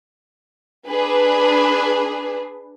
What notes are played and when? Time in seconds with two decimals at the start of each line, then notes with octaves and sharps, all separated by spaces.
0.88 D4 G#4 B4